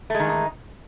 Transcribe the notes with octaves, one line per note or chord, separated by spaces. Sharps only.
D#3 E3 G#3 A3 D#4